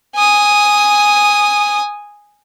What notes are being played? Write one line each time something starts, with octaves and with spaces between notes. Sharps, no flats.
G#5 D#6